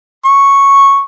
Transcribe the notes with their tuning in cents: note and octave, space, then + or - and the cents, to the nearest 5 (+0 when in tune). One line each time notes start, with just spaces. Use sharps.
C#6 -5